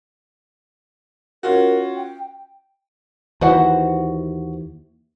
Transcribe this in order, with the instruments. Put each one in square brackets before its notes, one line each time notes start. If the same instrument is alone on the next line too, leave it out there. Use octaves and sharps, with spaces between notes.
[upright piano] C#4 F4 F#4 [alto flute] A#4
[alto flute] G5
[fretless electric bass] D#2 E3 [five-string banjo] F#4 C5 F#5